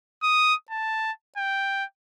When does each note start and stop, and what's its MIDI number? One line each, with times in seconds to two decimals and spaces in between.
0.23 0.54 87
0.71 1.11 81
1.37 1.84 79